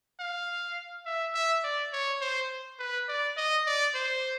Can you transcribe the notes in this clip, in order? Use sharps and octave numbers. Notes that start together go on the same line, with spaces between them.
F5
E5
E5
D5
C#5
C5
B4
D5
D#5
D5
C5